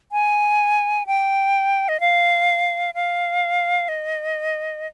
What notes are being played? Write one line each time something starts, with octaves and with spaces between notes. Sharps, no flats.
G#5
G5
D#5
F5
F5
D#5